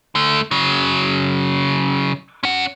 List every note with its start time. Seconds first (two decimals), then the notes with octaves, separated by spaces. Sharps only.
0.15 D3 A3
0.51 C#3 F#3
2.43 C#4 F#5